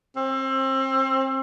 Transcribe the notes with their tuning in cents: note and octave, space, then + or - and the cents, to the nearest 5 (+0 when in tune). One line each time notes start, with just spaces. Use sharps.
C4 +30